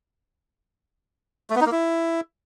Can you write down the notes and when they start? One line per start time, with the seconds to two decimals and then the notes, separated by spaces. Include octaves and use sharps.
1.50 A3
1.55 B3
1.61 D#4
1.66 A#3
1.72 E4